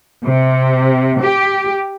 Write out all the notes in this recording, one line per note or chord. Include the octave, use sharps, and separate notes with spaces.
C3
G4